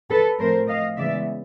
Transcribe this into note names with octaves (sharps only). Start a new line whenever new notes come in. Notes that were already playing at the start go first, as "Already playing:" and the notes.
A4 B4
A2 F3 A3 C4 A#4 C5
D#5 F5
C#3 E3 G#3 B3 D5 E5